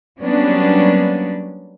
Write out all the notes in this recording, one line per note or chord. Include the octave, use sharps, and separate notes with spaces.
F#3 G3 A#3 B3 C#4 D4